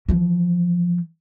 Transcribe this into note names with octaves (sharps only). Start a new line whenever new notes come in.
E3 F3